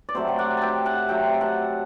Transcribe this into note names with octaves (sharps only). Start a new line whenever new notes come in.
D5
C3 F#3 A3 C5 E5
G5
D5 F#5
E5 G5 A5
F#5 A5
C3 F#3 A3 E5 G5
F#5 A5